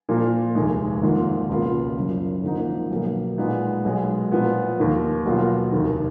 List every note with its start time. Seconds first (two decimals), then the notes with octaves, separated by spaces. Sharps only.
0.09 A#2 F3 A#3 F4
0.55 F1 D#2 D#3 G#3
1.02 G#1 G#2 D#3 A#3 F4
1.49 C#2 B2 A#3 F4
1.97 F#1 F#2 F3
2.44 G#1 G#2 F3 A#3 D#4
2.90 B1 B2 A#3
3.38 A#2 G#3 B3 D#4
3.85 B1 B2 G#3
4.31 A#2 F3 B3 F4
4.78 D#2 D#3 A#3 F4
5.25 B1 B2 A#3 F4
5.72 F1 D#2 D#3